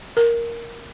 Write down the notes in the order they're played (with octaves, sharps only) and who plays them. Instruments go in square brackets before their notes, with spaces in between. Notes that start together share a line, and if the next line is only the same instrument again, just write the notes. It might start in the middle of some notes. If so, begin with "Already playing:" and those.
[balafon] A#4